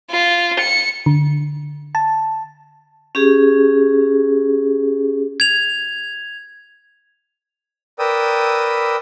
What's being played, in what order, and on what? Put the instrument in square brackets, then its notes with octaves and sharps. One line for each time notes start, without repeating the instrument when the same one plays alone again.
[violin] F4
C#7
[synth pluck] D3
A5
[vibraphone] C#4 G4 G#4
[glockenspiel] G#6 F7
[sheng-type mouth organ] A#4 B4 D5 G5 D#6 E6